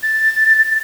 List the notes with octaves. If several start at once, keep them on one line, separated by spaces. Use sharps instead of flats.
A6